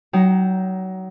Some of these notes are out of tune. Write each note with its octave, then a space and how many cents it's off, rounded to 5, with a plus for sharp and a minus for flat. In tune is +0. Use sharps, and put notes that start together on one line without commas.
F#3 +25 D#4 +0 G5 +0